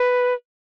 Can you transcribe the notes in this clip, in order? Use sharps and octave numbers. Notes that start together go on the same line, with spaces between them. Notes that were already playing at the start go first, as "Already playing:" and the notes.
Already playing: B4